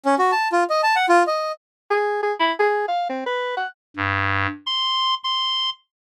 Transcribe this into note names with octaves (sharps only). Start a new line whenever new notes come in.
C#4
F#4
A5
F4
D#5
A5
F#5
F4
D#5
G#4
G#4
E4
G#4
F5
C4
B4
F#5
G2
C6
C6